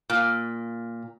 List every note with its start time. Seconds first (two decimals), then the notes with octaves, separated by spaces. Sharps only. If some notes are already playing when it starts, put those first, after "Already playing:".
0.10 A#2